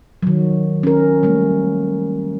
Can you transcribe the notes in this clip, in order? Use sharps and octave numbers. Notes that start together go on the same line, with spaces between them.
D#3 F#3
C#4 A#4
G3 A3 A#3